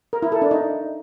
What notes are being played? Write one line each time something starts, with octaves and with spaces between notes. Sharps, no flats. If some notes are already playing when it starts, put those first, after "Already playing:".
A#4
E4
A4
D4
D#4